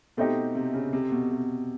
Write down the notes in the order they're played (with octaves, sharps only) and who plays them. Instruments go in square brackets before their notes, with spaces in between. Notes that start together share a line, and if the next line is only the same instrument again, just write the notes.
[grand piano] B2 [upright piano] A3 C4 D#4 G4
[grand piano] C3
C#3
C3
B2
C3